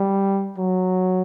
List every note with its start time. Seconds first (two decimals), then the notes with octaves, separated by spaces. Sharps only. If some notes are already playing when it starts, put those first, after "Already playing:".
Already playing: G3
0.58 F#3